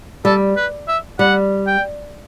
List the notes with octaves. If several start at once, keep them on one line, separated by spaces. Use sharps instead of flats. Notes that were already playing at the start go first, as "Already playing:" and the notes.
G3 A4
B4
E5
G3 F#5
G5